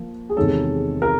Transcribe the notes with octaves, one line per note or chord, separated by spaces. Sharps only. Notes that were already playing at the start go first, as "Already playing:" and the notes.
Already playing: F3 A#3
G#4
E2 C3 D#3 G#3 C#4 A4
A#4